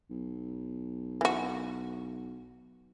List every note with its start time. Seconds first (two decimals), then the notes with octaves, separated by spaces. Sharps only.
0.10 B1
1.21 E3 F#4